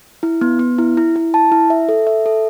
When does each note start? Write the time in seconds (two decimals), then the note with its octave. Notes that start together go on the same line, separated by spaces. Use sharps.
0.23 E4
0.41 B3
0.59 B3
0.78 E4
0.97 E4
1.16 E4
1.34 A5
1.52 E4
1.70 E5
1.89 A4
2.07 E5
2.26 A4